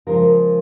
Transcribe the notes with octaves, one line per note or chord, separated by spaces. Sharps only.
C#3 F3 G#3 A#4